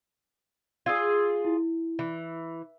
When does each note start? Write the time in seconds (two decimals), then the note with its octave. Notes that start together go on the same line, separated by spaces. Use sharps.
0.86 F4 G#4 D#6 E6 G#6
1.45 E4
1.99 E3